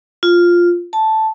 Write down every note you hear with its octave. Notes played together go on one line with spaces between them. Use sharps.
F4
A5